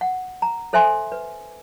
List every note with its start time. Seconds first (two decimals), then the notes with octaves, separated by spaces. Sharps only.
0.01 F#5
0.42 A#5
0.73 A4 C5 E5 G#5 C6
1.12 B4